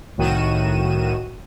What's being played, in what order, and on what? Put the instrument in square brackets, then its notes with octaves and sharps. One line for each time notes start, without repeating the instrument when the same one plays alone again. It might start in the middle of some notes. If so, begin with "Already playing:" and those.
[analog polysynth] C2 A2 D#3 F#4 D#7 E7